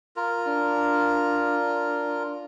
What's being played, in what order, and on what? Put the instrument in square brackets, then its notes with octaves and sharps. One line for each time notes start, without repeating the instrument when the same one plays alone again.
[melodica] F4 A#4
[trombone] D4